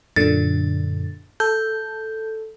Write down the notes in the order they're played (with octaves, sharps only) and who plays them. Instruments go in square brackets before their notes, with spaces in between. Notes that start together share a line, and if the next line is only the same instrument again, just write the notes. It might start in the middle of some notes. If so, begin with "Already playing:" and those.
[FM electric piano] F#2 A#2 D3 [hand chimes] A6
[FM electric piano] A4 [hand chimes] G6